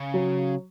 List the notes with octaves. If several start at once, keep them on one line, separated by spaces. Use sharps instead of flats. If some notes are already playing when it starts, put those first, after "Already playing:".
Already playing: C#3
F#3